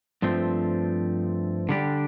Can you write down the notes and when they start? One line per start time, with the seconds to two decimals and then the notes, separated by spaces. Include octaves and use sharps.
0.22 G2 F3 A3 C4
1.69 D3 G3 D4 G4